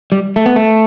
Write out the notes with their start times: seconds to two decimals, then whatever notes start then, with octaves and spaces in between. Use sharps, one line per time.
0.12 G3
0.36 A3
0.46 B3
0.56 A3